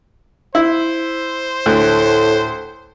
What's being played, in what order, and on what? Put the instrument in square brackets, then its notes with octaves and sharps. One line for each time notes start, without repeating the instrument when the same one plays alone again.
[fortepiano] E4 [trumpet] C5
[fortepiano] D2 [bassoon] A2